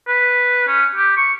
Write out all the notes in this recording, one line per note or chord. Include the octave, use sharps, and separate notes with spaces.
B4
C#4
G4
C#6